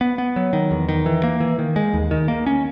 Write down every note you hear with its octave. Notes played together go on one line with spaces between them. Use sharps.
B3
B3
F#3
D#3
E2
D#3
E3
A#3
E3
D#3
G#3
D#2
D#3
A#3
C#4